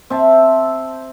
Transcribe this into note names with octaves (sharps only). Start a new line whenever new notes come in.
C4 E5 A5